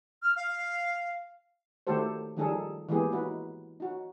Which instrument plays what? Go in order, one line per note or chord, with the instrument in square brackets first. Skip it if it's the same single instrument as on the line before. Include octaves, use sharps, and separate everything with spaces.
[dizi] F6
F5
[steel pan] D#3 A3 F#4 G4 A4 C5
D#3 F3 G3 D#4 G#4 A4
E3 G#3 A#3 B3 G4 G#4
D#4 E4 F#4 B4
D#4 F#4